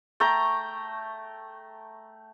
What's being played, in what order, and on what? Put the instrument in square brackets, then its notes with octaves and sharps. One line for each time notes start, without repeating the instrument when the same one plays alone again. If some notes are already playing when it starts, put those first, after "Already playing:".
[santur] A3 G5 A#5